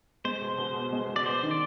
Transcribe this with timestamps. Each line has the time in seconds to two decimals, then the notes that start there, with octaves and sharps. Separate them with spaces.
0.25 G#3 C5
0.41 B2
0.58 B2
0.75 B3
0.92 G#3
1.09 B2
1.16 D5
1.26 B3 C5
1.43 D#3
1.51 D5